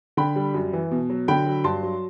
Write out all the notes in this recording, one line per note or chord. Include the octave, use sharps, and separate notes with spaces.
D3 G5 B5
G3
F#2
E3
B2
F#3
D3 G5 B5
F#3
G2 A5 C6
F#3